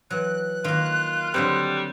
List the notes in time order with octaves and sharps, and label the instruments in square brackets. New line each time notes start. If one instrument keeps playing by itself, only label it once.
[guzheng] E3 F#3 [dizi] F#6
[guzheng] D#3 A#3 [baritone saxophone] F4
[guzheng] D3 F#3 C4 [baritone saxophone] G3